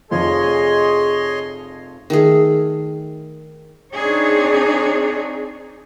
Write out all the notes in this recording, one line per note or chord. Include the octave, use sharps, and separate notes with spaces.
F1 F3 G#4 C#5 D#5 C6
D#3 A3 G#4
C4 D4 D#4 G#4 C#5